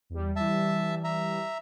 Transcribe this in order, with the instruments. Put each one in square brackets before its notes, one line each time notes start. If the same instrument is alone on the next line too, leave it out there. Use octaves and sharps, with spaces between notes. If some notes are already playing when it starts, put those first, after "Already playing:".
[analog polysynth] E2 G3
[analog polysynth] E3 G3 [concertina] E5 A5
[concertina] E5 A#5